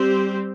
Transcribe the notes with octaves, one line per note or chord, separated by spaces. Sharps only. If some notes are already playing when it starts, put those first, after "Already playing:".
Already playing: G3 C4 G4 C5